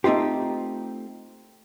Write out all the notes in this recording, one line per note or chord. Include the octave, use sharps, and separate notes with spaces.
A3 C4 D#4 F4 G4